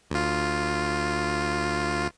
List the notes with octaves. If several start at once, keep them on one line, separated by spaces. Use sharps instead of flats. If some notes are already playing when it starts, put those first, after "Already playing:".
D2 F4